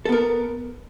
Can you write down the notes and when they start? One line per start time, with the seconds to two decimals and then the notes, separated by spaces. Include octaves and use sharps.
0.05 A4
0.09 B3
0.12 A#4